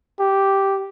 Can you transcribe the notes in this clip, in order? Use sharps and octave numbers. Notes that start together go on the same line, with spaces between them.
G4